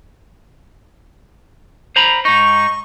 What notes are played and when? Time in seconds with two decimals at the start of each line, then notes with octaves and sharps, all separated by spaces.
1.96 C5 A#5 B5
2.25 G#2 D#4 C#6